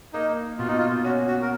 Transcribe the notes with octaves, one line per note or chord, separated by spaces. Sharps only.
A#3 D#4
B2 F4
D#4
F4
C#4 F#4
F#4
A#4